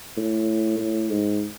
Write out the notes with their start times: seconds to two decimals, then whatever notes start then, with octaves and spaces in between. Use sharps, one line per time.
0.17 A2
0.79 A2
1.10 G#2